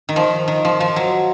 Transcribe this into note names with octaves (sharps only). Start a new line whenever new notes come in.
D#3
F3
D#3
F3
F3
F#3